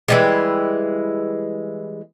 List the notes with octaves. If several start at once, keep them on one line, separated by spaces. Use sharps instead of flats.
E3 G3 G#3